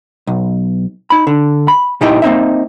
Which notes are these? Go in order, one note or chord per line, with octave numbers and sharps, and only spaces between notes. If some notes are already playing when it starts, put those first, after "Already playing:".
B1
D#4 B5
D3
B5
A#2 D#4 E4 G4 D#5
A#3 C4 D#4 E5